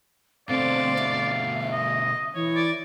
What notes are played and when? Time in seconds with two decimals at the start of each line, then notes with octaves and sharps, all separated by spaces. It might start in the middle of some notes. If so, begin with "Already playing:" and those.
0.49 B2 D3 A3 C4 D5 F5
0.98 E5
1.71 D#5
2.34 E3 C#5
2.55 D5